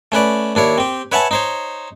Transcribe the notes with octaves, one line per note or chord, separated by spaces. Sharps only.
A3 C#4 B4 D5
D#2 D4 E4 C#5
C4 G4
B4 C#5 E5 F#5 G#5 A5
D#4 C5 C#5